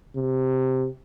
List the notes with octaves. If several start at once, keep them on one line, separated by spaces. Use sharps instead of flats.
C3